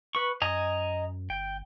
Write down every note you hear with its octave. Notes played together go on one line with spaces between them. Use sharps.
B4 C#6
F#2 D#5 G#5 A#5
G1 G5